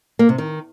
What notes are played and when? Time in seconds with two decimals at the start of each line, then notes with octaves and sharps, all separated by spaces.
0.19 A#3
0.29 C3
0.38 D#3